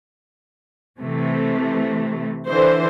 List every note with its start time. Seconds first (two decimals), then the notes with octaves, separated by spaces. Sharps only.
1.00 C3 E3 A3
2.49 D3 E3 C5